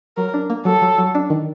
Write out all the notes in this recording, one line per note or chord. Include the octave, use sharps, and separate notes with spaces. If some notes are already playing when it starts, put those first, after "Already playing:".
F#3 A#4
D4
A#3
F#3 A4
F#3
F#3
D4
D#3